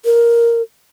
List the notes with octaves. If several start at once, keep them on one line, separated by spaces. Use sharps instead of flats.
A#4